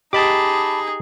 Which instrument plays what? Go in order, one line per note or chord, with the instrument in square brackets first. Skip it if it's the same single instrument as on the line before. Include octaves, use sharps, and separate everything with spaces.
[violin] D#4 G#4 [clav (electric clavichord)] G4 D#5 [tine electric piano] A5 B5 D6